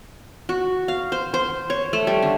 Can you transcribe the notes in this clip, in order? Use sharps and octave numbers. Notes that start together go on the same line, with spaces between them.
F#4
F5
C5
C5
C#5
A3
G3
D3